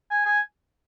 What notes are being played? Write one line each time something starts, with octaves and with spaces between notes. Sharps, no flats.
G#5
G#5